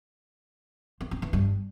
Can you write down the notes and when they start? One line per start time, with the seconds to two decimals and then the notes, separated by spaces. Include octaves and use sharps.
1.01 C4
1.11 C4
1.22 E3
1.33 G2